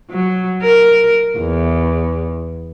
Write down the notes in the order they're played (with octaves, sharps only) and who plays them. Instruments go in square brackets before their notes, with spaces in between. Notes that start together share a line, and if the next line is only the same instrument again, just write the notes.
[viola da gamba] F#3
A#4
E2